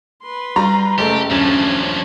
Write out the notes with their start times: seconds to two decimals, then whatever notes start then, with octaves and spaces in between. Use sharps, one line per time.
0.22 B4 C6
0.56 G3 A#5
0.98 F#1 A3 G4
1.30 D#1 F#2 F3 A3 C#4 D4 E7